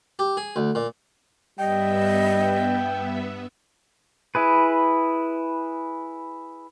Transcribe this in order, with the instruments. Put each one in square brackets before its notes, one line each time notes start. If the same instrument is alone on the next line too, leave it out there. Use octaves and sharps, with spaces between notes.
[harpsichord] G4
G#4
D2
A#2
[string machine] G2 B3 E5 [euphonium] G3 [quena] D#5 [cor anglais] G5
[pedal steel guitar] E4 G#4 B4